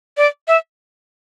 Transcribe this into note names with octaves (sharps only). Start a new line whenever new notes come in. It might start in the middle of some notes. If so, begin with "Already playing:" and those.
D5
E5